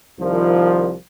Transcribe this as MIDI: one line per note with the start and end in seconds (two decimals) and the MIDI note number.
0.20 0.94 36
0.20 0.94 51
0.20 0.94 53